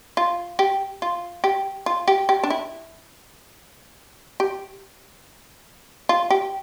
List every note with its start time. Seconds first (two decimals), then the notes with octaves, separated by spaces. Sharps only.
0.17 F4
0.59 G4
1.02 F4
1.44 G4
1.86 F4
2.08 G4
2.29 G4
2.43 D4
2.50 E4
4.40 G4
6.09 F4
6.30 G4